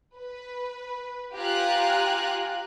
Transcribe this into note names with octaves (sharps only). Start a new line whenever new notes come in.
B4
F4 G4 F5 G#5 A#5 F#6